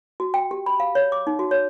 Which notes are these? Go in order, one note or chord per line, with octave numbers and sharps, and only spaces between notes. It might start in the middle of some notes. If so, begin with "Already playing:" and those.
F#4
G5
G4
B5
F5
C#5
D6
D#4
F#4
C#5